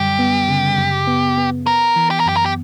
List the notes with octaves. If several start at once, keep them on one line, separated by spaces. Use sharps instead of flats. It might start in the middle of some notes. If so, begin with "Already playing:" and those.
Already playing: F#2 D3 G3 G4
B3
C#3
F#2
B3
B3
B3 A#4
E3
G4
A#4
F#2 G4
A#4
G4